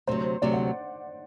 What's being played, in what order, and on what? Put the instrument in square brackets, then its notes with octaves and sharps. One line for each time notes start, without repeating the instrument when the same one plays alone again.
[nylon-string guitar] D2 C3 F#3 [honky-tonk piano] C5
[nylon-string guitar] D2 C3 F#3 [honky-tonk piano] D5
[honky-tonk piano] F#5